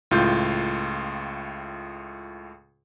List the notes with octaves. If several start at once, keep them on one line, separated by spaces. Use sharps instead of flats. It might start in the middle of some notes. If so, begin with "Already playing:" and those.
C#2 A2 F4 G6